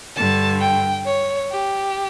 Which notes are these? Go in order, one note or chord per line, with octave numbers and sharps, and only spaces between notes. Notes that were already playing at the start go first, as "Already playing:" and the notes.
G2 D3 A5
G5
C#5
G4